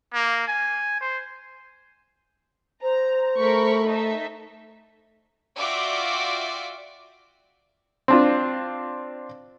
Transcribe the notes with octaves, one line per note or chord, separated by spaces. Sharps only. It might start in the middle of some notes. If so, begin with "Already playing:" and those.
A#3
G#5
C5
C5 A#5
A3 A#4 B5 C#6
D#4 A4 E5
F4 F#4 D5 E5 G5 D6
C4 D4 F4